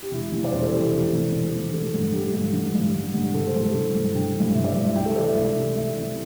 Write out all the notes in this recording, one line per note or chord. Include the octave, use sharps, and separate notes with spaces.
G4
E1 E4
E2 C3 E3
D5
E1 C5
A4
E2 C3 E3 G4
E4
E1 G4
E2 C3 E3
E1
E2 C3 E3
A1 A4
G2 D3
A1 G4
G2 D3
A1
G2 D3
A1
G2 D3
G1 A4
C5
G2 E3 A4
G1
G2 E3
G1 G5
G2 E3
G1 E5
D5
G2 E3 E5
E5
C2 G5
A4
C3 E3 D5
E5
C2
C3 E3
C2 E5
C3 E3